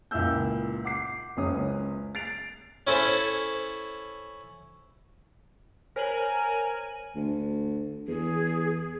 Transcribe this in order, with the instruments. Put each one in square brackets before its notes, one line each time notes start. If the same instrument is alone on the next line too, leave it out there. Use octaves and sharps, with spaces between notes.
[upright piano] C#2 A#2 A#3 E4 E6 G6
F#5 D6 C7
F#1 C#2 G#3 C#4 D#6
A6 C7 D7 F7
[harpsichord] C#4 E4 A4 C5
[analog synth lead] A#4 [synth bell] C5 C#5 F#7 [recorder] G#5
[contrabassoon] D2
[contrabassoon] E2 [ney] G#4